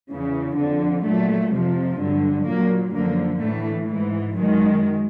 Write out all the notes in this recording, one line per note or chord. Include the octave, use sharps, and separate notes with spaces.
E2 C#3 E3
F2 D3 F3
A#2 F#3 A3
F2 C3 F3
G2 D3 F#3
A#2 F#3 A#3
F#2 D3 F3 A#3
A2 E3 A3
G#2 E3
F#2 D#3 F#3 G#3